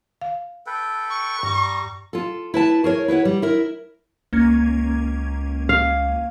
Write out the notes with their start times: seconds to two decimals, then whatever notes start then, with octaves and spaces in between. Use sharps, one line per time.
0.21 F5
0.67 A4 B4 G5
1.11 C#6
1.43 G2 G3 A#5
2.13 F4 A4
2.54 E4 B4 A5
2.84 G#4 A#4 C#5
3.08 E4 B4 C#5 F#5
3.25 G3
3.42 E4 A#4
4.33 C#2 A#3 C#4 G#6
5.69 F5